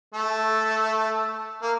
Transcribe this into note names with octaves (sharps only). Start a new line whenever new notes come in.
A3
A#3